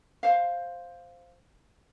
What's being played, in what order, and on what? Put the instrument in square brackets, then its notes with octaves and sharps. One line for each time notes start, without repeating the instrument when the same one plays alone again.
[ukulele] C5 F5